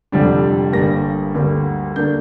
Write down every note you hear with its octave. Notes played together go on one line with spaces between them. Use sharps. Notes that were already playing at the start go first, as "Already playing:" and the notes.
F1 F2 D3 G3 D4
G1 G2 G3 A#3 A#6
D2 D3 G3 A#3
D3 A#3 D4 G6